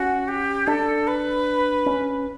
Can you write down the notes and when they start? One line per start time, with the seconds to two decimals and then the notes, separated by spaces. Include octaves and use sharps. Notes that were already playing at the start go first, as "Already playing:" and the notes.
Already playing: C#4 F#4
0.28 G4
0.67 D4 A4
1.07 B4
1.86 C#4